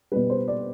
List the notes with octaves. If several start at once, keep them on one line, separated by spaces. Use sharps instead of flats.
B2 G3 B4
C5
D5